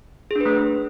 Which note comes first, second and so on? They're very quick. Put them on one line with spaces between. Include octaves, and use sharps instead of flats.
G#4 D4 B4 A3